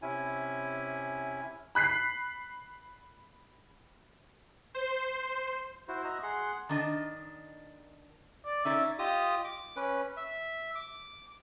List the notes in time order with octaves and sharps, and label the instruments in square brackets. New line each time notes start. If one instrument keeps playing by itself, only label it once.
[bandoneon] C3 C#4 E4 G#5
[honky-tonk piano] B5 F#6 B6 C7
[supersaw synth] C5
[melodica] E4 F#4 C5
F#4 D#5 E5 A#5
G#4 F#5 C6
[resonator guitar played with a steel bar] D#3 D4 D#5
[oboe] D5
[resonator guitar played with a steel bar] C#4 D#4 D5 [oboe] E5
[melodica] F4 G4 D#5 D#6
D6
C#4 B4
E5
D6